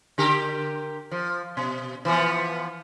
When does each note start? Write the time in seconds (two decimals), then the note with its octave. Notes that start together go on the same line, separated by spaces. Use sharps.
0.18 D3 G4 A#4
1.11 F3
1.57 B2
2.05 E3 F3 B3